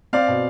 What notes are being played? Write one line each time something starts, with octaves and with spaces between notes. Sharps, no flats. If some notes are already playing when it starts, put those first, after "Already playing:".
C4 D5 F5
B2